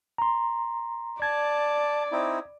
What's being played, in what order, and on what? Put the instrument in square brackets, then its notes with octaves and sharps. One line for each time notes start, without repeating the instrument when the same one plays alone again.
[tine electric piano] A#5 C6
[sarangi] D5 [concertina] A5 [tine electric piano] G#6
[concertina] C4 D#4 E4